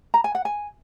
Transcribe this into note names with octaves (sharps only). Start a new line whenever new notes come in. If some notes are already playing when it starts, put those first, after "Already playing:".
A#5
G#5
F#5
G#5